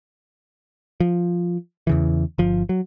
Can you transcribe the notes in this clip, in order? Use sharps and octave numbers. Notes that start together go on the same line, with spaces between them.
F3
E2 C#3 E3
G1 F3
F#3